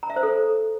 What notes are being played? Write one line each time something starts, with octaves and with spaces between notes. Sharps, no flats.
A#5
E5
C5
A4